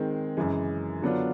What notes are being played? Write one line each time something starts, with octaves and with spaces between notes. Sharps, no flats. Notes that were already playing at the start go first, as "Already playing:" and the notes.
Already playing: D#3 G#3 C4
F#2 C#3 E3 G#3
D3 F#3 B3 D4 F4